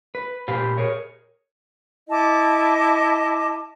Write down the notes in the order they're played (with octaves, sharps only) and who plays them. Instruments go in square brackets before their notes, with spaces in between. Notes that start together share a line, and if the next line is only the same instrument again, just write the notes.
[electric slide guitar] B4
A#2 G4 B4 C5 F5
G#4 A#4 C#5
[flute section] E4 D#5 A5 D6